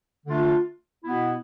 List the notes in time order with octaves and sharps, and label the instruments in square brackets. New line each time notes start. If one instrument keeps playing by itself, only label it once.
[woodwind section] D3 A3 D4 F4
B2 B3 E4